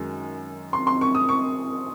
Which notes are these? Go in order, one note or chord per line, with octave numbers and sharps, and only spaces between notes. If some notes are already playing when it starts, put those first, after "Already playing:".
Already playing: F#2 D#3 G#3
C6
C6
C#6
D#6
C#6